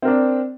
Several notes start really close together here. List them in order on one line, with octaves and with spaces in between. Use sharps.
C4 A#4 D4